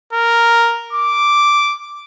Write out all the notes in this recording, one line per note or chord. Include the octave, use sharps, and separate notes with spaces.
A#4
D6